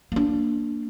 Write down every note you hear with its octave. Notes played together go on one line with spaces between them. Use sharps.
A#3 D4